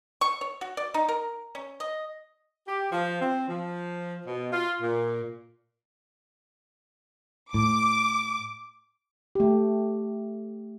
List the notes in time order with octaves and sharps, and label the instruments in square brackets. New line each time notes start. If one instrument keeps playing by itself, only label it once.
[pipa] C#6
C#5
F#4
D5
D#4
A#4
C#4
D#5
[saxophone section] G4
F3
C4
F3
B2
F4
A#2
[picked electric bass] A2 [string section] D6
[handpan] A3 G4